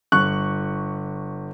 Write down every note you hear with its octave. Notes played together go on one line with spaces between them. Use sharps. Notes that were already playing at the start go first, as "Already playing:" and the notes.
G1 C#6 F#6